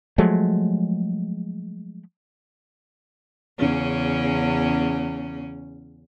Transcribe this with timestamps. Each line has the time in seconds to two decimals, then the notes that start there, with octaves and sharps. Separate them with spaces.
0.18 F3 F#3 G#3 A3
3.59 E2 C#3 C#4